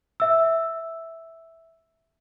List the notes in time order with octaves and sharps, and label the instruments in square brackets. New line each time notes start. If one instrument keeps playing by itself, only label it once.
[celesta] E5 E6